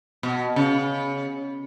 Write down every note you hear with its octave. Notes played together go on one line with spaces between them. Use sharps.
B2
C#3